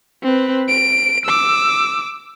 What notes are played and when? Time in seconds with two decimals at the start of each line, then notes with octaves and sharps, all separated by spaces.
0.23 C4 B4
0.69 D7
1.26 D6 E6